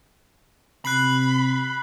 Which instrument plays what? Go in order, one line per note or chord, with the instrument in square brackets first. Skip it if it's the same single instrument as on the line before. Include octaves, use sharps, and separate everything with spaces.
[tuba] C3 [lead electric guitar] B5 [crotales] F#6 C7 F#7